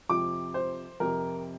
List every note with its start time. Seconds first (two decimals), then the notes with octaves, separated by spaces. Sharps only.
0.09 F2 C3 F3 D6
0.54 C5
1.00 F2 C3 F3 A#4